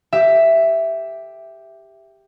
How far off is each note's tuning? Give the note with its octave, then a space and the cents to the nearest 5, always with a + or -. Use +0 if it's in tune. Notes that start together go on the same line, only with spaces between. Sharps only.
G4 +5 E5 +5